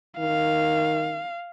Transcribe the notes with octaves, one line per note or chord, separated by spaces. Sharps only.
D#3 F5